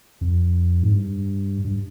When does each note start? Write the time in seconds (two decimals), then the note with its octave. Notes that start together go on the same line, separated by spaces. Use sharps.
0.21 F2
0.82 G#2
0.93 G2
1.65 G2